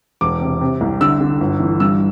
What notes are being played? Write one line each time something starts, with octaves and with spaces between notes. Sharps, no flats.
E1 D6
C3
C3
C2
D3 E6
D3
G1
E3
G2 E6